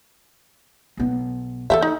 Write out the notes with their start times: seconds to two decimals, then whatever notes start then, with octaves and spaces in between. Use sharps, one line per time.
0.97 B1 B3
1.70 E3 A4 C5 E5
1.82 D#4